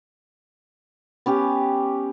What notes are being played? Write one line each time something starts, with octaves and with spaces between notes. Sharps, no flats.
B3 C#4 G4